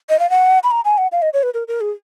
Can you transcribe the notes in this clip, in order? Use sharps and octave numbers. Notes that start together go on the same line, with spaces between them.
D#5
F5
F#5
B5
A#5
G#5
F#5
F5
D#5
C#5
B4
A#4
A#4
G#4